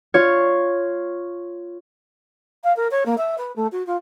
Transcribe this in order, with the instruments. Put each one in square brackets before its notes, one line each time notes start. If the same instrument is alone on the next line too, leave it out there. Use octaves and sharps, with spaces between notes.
[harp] F4 C#5
[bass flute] F5
A#4
C#5
A#3
E5
B4
A3
F#4
F4